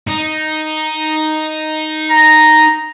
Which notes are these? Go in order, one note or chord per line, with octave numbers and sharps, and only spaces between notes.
D#4
A#5